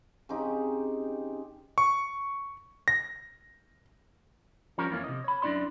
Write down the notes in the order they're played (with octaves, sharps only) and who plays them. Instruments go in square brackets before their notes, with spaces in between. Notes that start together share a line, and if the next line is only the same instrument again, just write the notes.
[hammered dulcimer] C#3 C4 D#4 G4
[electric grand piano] C#6
A#6
[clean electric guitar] F3 G3 C#4 A#4 C5 C#5
F2 E3 A#3 C#4
C3 D#5
C#5 B5
F#2 G#3 D4 E4 D5 C6